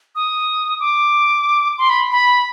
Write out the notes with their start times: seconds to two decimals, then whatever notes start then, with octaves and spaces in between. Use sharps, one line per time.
0.15 D#6
0.80 D6
1.78 C6
1.90 B5
2.12 B5